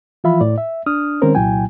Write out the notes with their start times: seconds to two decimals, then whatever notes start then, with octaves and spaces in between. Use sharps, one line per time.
0.24 E3 F3 F4 E5 F5 B5
0.41 A2 E4 D5
0.58 E5
0.86 D4 D#6 F6
1.22 D#3 G#3 C4 C#4 A#4 C5
1.35 C2 A#2 F#3 E4 G5 G#5